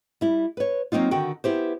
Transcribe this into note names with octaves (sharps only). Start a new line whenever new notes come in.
G3 E4
B4 C#5
F#3 A#3 C4 D#4 F4
D3 D#3 F#4 G5
B3 E4 G4 C5